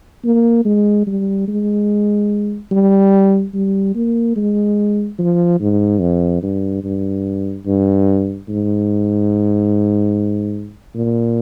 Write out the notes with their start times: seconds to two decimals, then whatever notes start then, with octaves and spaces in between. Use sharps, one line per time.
0.25 A#3
0.65 G#3
1.07 G3
1.48 G#3
2.71 G3
3.54 G3
3.95 A#3
4.36 G#3
5.19 F3
5.60 G#2
6.01 F2
6.43 G2
6.84 G2
7.66 G2
8.49 G#2
10.95 A#2